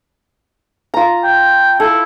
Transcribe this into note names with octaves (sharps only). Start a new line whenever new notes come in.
F4 A#5
G5
E4 A4